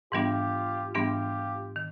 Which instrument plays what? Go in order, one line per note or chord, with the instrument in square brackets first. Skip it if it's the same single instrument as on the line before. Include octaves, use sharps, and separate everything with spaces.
[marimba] G#2 E3 G3 B3 D4 [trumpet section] F4 G4
[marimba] G#2 E3 G3 B3 D4 [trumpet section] F4 G4
[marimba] D#3